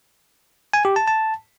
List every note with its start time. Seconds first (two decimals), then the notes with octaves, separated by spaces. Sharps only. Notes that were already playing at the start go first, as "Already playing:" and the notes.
0.73 G#5
0.85 G4
0.96 A5
1.07 A5